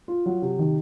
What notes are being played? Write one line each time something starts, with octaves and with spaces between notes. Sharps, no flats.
F4
F#3
C3
D#3